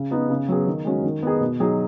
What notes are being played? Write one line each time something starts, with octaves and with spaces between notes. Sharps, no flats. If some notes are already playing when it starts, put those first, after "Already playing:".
Already playing: C#3
B3 D#4
C#3
F#3 B3 G#4
D#3
G#3 C#4 F#4
D#3
B3 D#4 G#4
B2
F#3 D#4 G#4